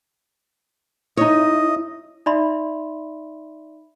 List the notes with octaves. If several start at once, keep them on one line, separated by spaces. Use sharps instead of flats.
D#4 E4 C#5 D#5
D#4 D5 E5 B5 C6